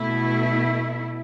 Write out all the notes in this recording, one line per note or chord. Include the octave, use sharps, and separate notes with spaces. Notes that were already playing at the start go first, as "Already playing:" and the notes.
Already playing: B2 A3 E4